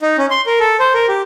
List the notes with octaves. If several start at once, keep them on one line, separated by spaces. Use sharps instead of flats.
D#4
C#4
C6
A#4
A4
C5
A#4
G4